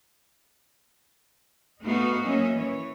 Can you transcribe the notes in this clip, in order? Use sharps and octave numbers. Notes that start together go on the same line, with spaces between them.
A3 B3 D#4 F#4 B4 F5
F#3 A#3 C#4 D#5 E5
E3 C#5